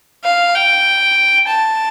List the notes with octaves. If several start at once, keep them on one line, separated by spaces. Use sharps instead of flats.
F5
G5
A5